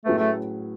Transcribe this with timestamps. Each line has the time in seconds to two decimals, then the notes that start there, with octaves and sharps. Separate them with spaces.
0.05 A2 F#3 A3 C#4 G#4 B4
0.19 A3